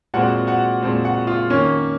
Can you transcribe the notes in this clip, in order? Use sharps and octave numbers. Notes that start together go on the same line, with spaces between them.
A#2 G#3 C4 F#4 F#5
F#4 F#5
A#2 G#3 C4
F#4 F#5
F4 F5
D#3 A#3 C#4 C#5